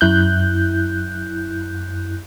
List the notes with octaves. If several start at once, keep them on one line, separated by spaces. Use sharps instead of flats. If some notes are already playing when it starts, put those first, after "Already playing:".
F#2 E4 F#6 G6